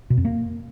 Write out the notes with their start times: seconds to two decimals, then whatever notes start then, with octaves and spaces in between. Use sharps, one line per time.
0.10 B2
0.17 F2
0.25 A#3